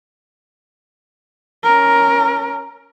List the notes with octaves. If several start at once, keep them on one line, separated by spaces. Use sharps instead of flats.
C#4 A#4